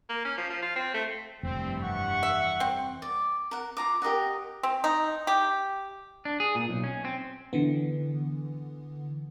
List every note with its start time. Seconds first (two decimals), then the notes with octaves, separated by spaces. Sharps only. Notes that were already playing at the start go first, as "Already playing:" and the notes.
0.09 A#3
0.25 C#4
0.38 F3
0.50 F3
0.62 F4
0.76 C4
0.94 A3
1.43 F1 G2 E3 G3 C4
1.82 F#5 C#6
2.23 E5
2.60 C4
3.02 D5
3.51 A#4 F#5
3.77 F4 A#5 D6
4.02 G4 A#4 D#5 F#5
4.63 C4
4.84 D#4
5.27 G4
6.25 D4
6.40 G#4
6.55 A#2
6.69 B1
6.84 C#4
7.05 C4
7.53 D3 E3 B3